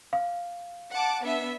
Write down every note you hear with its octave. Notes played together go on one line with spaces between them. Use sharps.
F5
F#5 A5 D6
B3 D4 E5